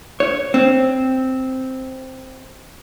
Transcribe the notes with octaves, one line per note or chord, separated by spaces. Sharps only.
C#5
C4